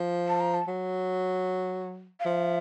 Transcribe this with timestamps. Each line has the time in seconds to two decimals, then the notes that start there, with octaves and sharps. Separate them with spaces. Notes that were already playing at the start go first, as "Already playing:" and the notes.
Already playing: F3
0.28 A5
0.40 A#5
0.54 A5
0.68 F#3
2.20 F5
2.24 F3 E5